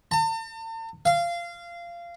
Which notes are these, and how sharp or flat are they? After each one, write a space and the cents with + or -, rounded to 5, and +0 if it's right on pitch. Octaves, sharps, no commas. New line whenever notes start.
A5 +45
F5 -20